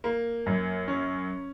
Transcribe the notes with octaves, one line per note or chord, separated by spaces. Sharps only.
A#3
F#2
C#4